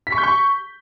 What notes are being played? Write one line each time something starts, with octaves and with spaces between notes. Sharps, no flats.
B6
C#6
G6
C#6